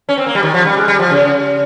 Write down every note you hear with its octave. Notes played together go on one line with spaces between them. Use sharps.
C#4
C4
A#3
G3
D#3
F3
G3
G#3
G3
F3
C#3